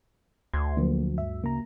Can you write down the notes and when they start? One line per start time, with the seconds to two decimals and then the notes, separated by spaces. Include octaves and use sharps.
0.53 D2 C6 G#6
0.77 D3 F3 F#3 A#3
1.18 G2 E5
1.44 C#3 A#3 A#5